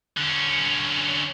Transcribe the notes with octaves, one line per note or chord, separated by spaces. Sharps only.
D3 C#4